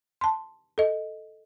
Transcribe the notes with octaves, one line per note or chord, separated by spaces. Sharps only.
A5 C6
A4 D#5